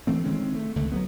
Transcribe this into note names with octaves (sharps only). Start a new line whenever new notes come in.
E3 A3 C4
D#3 G#3 C4 C#4
A3
C#2 D3 A3
F#3 G#3 B3